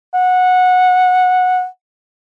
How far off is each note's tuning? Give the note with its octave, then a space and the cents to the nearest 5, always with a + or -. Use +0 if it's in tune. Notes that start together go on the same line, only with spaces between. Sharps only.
F#5 -15